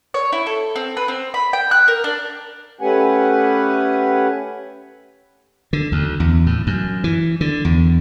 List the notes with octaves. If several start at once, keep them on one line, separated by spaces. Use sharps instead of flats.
C#5
E4
A4
C4
B4
C4
B5
G5
F#6
A#4
D4
A3 C#4 G4 B4 F#5 G#5
D3
D2
E2
A2
F#2
E3
D3
E2